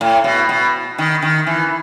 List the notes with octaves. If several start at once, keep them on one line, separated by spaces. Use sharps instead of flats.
A2
B2
B2
D#3
D#3
E3